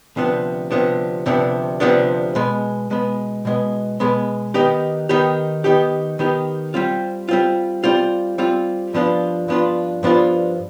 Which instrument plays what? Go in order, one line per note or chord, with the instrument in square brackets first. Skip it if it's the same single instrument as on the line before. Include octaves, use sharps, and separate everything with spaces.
[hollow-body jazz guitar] D2 C3 F3 B3 D4
D2 C3 F3 B3 D4
D2 C3 F3 B3 D4
D2 C3 F3 B3 D4
B2 G#3 B3
B2 G#3 B3
B2 G#3 B3
B2 G#3 B3
D#3 B3 D#4 G4
D#3 B3 D#4 G4
D#3 B3 D#4 G4
D#3 B3 D#4 G4
G3 C4 F4
G3 C4 F4
G3 C4 F4
G3 C4 F4
G2 F3 B3 D4 F4
G2 F3 B3 D4 F4
G2 F3 B3 D4 F4